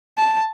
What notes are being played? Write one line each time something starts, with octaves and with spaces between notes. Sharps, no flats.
A5